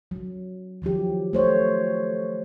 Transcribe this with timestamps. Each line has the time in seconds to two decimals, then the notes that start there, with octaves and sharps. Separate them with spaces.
0.11 F#3
0.82 D#3 F3 F#3 G4
1.33 A3 C5 C#5